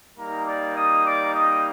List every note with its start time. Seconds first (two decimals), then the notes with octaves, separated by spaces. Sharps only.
0.17 G3 A#3 D#4 A#4 A#5
0.45 D5 D6
0.75 D#5 D#6
1.04 D5 D6
1.32 D#5 D#6